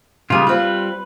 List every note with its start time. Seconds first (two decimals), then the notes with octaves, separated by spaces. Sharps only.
0.30 C#3 G3 G#3 F4 G#4
0.47 G3 C4 F4 B4